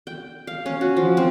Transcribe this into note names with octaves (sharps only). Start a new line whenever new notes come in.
G5
F5
C#4
F#4
F3
C4